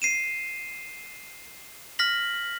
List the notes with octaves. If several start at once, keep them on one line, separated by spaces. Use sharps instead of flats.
C7 D#7 E7
F6 A#6 B6 F#7